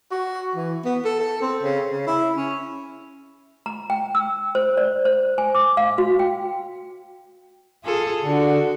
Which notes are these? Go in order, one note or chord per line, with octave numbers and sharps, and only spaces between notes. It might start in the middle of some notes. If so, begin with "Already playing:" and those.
F#4
E3
B3
A4
A4
C4
C#3
C#3
E4
C#4
A#5
G5
E6
C5
D5
C5
G#5
D6
F5
F#4
G5
F4 G#4 A4
D3 F#4